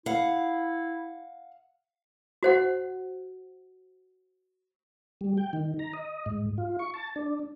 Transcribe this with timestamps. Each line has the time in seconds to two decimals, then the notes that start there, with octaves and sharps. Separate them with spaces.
0.06 E4 F5 F#5
2.43 F#4 C5 F#5
5.21 G3
5.37 G5
5.53 D#3
5.79 A#5
5.93 D#5
6.26 G#2
6.58 F4
6.79 C#6
6.94 A5
7.16 D4